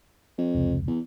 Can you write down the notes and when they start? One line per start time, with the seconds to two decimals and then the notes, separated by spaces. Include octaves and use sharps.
0.38 F2
0.54 F1 C#2
0.87 E2